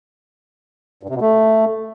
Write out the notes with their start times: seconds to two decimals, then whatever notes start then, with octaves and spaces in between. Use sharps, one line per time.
1.03 G2
1.09 C3
1.15 B2
1.21 A3